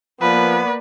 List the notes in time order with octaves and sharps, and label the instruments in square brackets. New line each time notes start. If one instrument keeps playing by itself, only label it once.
[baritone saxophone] F3 [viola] A#3 D5 [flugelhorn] B3 [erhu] B4